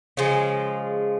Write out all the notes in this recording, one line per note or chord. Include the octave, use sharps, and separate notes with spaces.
C#3 F3 G#3